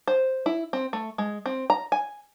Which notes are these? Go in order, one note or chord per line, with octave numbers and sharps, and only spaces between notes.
C5
E4
C4
A3
G#3
C4
A#5
G#5